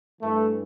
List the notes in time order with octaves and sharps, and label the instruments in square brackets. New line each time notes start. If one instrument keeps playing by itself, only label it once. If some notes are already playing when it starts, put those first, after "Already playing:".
[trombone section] G2 E3 A3